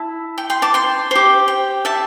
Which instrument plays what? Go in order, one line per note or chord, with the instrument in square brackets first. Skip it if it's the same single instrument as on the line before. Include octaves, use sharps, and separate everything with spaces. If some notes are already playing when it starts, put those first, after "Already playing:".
Already playing: [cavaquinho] E4 E5 A5
G5
G5 C6
A5 D6
G5 C6
G4 C5
G5
E5 A5